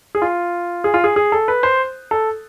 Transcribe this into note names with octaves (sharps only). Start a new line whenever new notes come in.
G#4
F4
G#4
F4
G#4
G#4
A4
B4
C5
A4